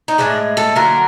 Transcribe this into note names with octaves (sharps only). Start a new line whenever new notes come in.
D#4
A2 F3 G#3 D4
A4
D3 F#3 A#3 A#4